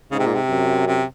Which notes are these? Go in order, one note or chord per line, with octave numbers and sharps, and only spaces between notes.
G#2 C#3
C3
A#2
C3
F#2
C3